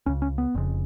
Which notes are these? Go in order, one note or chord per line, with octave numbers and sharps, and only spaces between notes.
C#2 C#3 C#4
C#4
B3
F1 F2 C#3